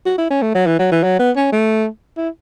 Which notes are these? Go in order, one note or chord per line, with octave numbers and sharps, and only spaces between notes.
F#4
E4
C#4
A3
F#3
E3
F#3
E3
F#3
B3
C#4
A3
E4